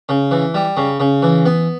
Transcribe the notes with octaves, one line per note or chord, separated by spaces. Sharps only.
C#3
E3
G3
C#3
C#3
E3
B3